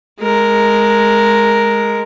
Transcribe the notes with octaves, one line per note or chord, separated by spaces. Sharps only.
G#3 A#4